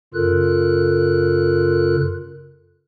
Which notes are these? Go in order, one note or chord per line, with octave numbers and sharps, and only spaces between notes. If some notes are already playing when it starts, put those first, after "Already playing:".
F#2 C#3 F4 A4 A#4 F#6